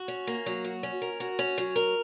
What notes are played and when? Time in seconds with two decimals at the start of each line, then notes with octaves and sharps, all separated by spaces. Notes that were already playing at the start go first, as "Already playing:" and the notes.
Already playing: F#4
0.08 C#4
0.27 A#3
0.46 F#3
0.64 F#4
0.83 C#4
1.02 A#4
1.20 F#4
1.39 C#4
1.58 F#3
1.76 A#4